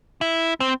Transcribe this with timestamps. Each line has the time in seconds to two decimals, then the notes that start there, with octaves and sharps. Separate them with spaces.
0.21 E4
0.60 C4